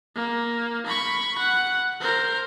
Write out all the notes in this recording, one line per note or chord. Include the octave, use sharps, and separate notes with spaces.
A#3
B5 C#6
F#5
A#4 C5